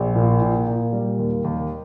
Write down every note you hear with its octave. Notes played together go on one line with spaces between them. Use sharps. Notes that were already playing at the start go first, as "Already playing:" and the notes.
Already playing: A#1
A#2
A#2
A#2
G3
D#2
D#2